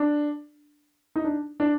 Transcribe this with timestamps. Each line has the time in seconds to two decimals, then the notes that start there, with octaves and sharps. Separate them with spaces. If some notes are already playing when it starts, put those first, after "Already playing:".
Already playing: D4
1.16 D#4
1.24 D4
1.60 D4